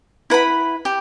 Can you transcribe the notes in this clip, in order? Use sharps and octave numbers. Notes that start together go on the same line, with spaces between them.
E4 B4 F#5 B5
G4